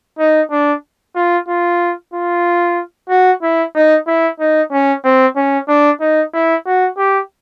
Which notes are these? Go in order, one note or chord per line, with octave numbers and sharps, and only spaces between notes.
D#4
D4
F4
F4
F4
F#4
E4
D#4
E4
D#4
C#4
C4
C#4
D4
D#4
E4
F#4
G4